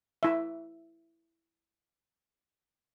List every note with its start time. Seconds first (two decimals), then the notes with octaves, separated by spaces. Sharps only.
0.23 E4 E5